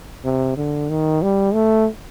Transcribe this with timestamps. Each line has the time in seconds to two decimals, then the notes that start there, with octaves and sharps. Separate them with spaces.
0.25 C3
0.57 D3
0.89 D#3
1.22 G3
1.54 A3